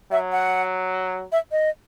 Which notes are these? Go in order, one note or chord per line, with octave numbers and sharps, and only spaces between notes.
F#3 E5
F#5
E5
D#5